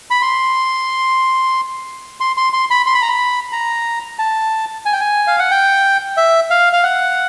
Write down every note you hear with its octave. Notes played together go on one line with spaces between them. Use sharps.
B5
C6
C6
C6
C6
B5
C6
B5
A#5
B5
A#5
A5
G#5
G5
G#5
F5
F#5
G5
E5
F5
F5
F#5